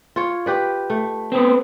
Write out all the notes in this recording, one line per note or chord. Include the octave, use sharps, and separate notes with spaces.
F4 C#5
G4 B4 D5
A3
B3 C4